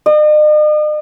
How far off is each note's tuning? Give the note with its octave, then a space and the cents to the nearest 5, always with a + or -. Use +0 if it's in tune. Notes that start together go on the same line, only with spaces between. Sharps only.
D#5 -45